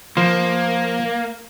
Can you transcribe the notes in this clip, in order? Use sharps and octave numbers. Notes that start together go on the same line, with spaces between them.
F3 A#3 C5